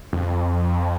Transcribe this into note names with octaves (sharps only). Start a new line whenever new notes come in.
F2